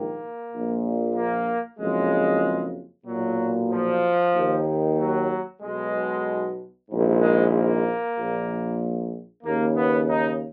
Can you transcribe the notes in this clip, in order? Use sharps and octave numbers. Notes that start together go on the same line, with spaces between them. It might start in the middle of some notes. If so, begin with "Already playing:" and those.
Already playing: A#1 G#2 D#3 A#3
A#1 A#2
A#3
F#1 F2 C#3 G#3
B1 A#2 F#3
F3
D#2 D#3
F#3
B1 B2 G#3
A#1 G#2 D#3
G#3
A#3
A#1 A#2
D#2 C#3 A#3
B3
D#4